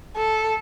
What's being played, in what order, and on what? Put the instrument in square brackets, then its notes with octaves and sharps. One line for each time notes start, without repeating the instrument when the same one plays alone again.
[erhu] A4